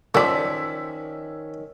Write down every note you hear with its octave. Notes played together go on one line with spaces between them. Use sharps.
F#2 D3 D#3 F3 C#4 D5 E6 B6